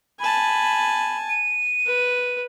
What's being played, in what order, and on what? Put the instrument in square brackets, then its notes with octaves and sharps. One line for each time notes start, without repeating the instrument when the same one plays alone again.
[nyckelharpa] G#5 A5 [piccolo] B5
[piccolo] D#7
[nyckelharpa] B4